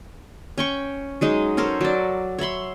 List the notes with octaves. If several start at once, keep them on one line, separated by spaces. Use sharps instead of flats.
C#4 G5 C#6
F#3 G#3 D#4
C#4 A4 A#4 C5
F#3 D5
C#5 E5 B5 C6